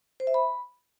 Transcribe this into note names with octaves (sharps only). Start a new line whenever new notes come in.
C5
E5
B5